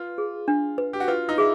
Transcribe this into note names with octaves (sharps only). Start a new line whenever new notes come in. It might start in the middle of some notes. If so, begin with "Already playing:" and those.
Already playing: F4 B4
G#4
D4
B4
G4
F#4
F4 B4
D#4
E4 G#4